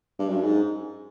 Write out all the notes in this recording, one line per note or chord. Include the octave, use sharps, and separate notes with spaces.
G2
F#2
G#2